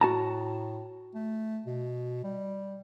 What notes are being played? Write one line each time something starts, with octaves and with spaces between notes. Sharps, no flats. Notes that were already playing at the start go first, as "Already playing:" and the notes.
A2 F#4 A5 A#5
A3
B2
G3